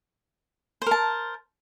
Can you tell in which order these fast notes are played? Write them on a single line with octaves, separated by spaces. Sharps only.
C5 A#4 A5